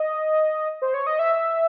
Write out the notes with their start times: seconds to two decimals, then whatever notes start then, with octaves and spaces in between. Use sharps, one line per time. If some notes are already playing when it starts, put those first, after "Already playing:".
Already playing: D#5
0.82 C5
0.94 C#5
1.07 D#5
1.19 E5